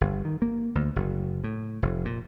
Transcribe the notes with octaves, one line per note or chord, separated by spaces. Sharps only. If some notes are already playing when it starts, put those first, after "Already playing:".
G1
D#3
A#3
D2
F#1
A2
F1
A#2